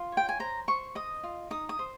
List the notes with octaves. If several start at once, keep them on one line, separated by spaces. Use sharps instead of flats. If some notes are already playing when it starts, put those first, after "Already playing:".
Already playing: F4
C#5 G5
G#5
C5 A#5
C5 C#6
D#5 D#6
F4
D#4 D#6
D#6
C5